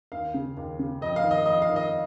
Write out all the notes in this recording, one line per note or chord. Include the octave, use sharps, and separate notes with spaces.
D#2 F5
C#3
D#2
C#3
F2 D#5
F5
D#3
D#5
F2 D#5
F5
D#3
D#5